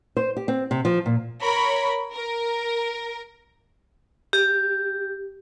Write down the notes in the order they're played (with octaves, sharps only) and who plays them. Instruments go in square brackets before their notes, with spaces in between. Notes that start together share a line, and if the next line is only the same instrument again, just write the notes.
[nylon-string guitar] C5
G4
C4
C3
F3
A#2
[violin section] A#4 C#5 B5
A#4
[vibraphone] G4